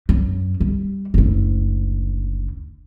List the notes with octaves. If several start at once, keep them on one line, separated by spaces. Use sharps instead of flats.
F#2
G3
F#1 D2